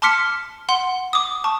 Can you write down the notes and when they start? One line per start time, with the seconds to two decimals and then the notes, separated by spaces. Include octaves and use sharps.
0.02 A5 C6 D6 F6 B6 C#7
0.69 F#5 C6 G7
1.13 D6 D#6
1.44 A5 C#6